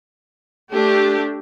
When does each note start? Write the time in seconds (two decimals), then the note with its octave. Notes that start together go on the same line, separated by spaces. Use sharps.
0.72 A3 D4 G4